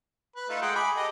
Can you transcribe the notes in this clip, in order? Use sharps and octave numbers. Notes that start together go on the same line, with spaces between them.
B4
A3 D#4 F4
G#3 F#5 G5
G#4 B5 D6
G4 A4 D#5